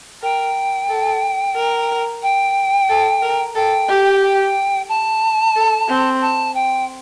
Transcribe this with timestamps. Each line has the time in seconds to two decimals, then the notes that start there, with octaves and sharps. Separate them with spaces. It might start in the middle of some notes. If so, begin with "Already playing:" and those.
0.22 A#4 G5
0.89 A4
1.55 A#4
2.23 G5
2.89 A4
3.22 A#4
3.55 A4 G5
3.88 G4
4.22 G5
4.89 A5
5.56 A4
5.88 C4
6.21 A5
6.55 G5